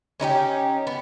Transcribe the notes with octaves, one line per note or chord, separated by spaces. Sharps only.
C#4 D#4 E4 G4
B3